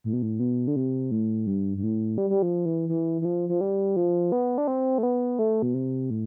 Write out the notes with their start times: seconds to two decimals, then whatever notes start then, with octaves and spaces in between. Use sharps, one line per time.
0.04 A2
0.13 B2
0.22 A2
0.40 B2
0.67 D3
0.76 C3
1.11 A2
1.47 G2
1.77 G2
1.83 A2
2.18 G3
2.30 G3
2.42 F3
2.66 E3
2.89 E3
3.22 E3
3.25 F3
3.49 F3
3.61 G3
3.96 F3
4.32 B3
4.58 D4
4.68 C4
4.98 A3
5.03 B3
5.39 A3
5.62 B2
5.74 C3
6.10 A2